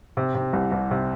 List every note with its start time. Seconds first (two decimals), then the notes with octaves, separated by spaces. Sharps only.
0.17 C3
0.35 C3
0.53 C2
0.72 C2
0.91 C3